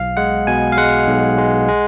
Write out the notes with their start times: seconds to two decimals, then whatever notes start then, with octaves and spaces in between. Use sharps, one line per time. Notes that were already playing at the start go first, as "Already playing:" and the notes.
Already playing: B1 F5
0.17 G#3 F#5
0.47 B2 G#5
0.72 F5
0.77 G#3 F#5
1.07 B1
1.38 G#3
1.68 G#3